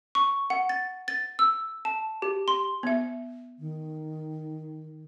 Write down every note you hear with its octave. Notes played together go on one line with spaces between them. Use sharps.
C#6
F#5
A6
A6
E6
A5
G4
C6
B3 E5
D#3